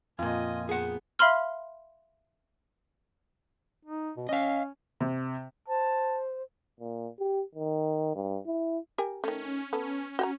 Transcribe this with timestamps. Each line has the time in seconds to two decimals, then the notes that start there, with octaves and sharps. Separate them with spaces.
0.19 F2 A#2 F4 D#5 G#5
0.69 B3 G#4 F#5
1.19 E5 F5 B5 C6 F6
3.85 D#4
4.17 B2
4.29 C#4 D#5 F5
5.01 C3
5.68 C5 A5
6.80 A#2
7.19 G4
7.55 D#3
8.16 G2
8.46 E4
8.98 G4 A#4 G#5
9.24 D#3 A3 C#4
9.73 B3 A4
10.19 F#4 G5 A#5